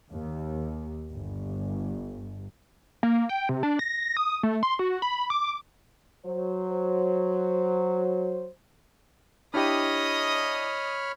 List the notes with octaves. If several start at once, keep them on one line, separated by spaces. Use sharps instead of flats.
D#2
G1
A#3
G5
C3
D4
A#6
D#6
A3
C6
F#4
B5
D6
F#3 C5
D4 E4 G4 C#5 D#5 B5 D#6 F6